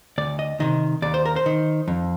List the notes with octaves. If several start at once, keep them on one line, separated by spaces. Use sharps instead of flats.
D2 D5
D#5
C3 D#3 D#5
D#2 D5
C5
A#4
C5
D#3
F2